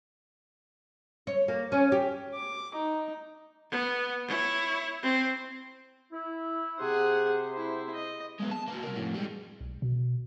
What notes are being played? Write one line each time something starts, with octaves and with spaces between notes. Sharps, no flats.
C#5
A#3
C#4
G4
D6
D#4
B3
E4 C#5
C4
E4
C3 G4 G#4 C5 F#5
E4
D#5
G#3 B3
A5
A#3 F#4
C2 A#4
F2 A2
G3 G#3
B1
B2